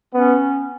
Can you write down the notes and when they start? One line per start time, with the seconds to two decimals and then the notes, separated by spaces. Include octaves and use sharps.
0.14 B3 C#4